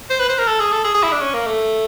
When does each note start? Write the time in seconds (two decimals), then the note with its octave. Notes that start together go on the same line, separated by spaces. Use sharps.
0.10 C5
0.20 B4
0.29 C5
0.38 A#4
0.47 A4
0.60 G#4
0.72 A4
0.84 G#4
0.94 G#4
1.03 E4
1.12 D4
1.21 C#4
1.34 A#3
1.46 A3